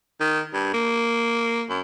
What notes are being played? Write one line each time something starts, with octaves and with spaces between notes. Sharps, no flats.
D#3
G2
A#3
F#2